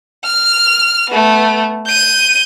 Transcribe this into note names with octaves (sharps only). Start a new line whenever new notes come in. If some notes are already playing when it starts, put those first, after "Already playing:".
F6
A3 B3
G6 D#7